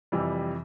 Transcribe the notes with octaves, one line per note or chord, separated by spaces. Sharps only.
F2 C3 E3 G3